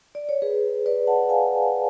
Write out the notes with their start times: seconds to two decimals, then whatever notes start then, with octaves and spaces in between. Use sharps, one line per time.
0.15 D5
0.29 C#5
0.42 G#4 B4
0.86 B4 D5
1.07 F#5 A5
1.29 F5 G#5